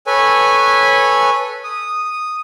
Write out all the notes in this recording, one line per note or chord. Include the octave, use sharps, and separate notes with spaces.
A4 B4 C#5 G#5
D#6